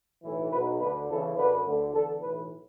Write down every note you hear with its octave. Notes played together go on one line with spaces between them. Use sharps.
B1 A2 E3
B1 B2 B4
D2 D3 B4
E2 C#3 E3 A4
F#2 D3 B4
D2 D3
E2 D3 A4
B1 A2 E3 B4